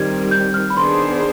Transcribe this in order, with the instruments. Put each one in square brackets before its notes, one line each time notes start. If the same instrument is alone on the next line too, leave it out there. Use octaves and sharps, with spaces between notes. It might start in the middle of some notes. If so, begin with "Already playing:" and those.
Already playing: [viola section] D#3 G3 C4 [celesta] G#6
[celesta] G6
F6
B5
[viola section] D#3 B3 D4 G#4 C5 [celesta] C6